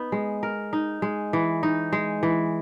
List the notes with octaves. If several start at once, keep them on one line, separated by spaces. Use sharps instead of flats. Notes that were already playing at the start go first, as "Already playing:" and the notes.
Already playing: B3 D#4
G#3
A#4
D#4
G#3
E3
D#4
G#3
E3